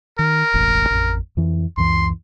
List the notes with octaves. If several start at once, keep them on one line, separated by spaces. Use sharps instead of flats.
D#3 A#4
E1 A1 A2
A1 F2
F2 E3
C#2 F#2 E3 C6